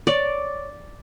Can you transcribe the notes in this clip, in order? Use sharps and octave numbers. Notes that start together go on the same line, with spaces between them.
C#5 D5